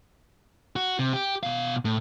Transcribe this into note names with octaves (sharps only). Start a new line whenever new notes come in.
F#4
C3
G4
B2 F5
A2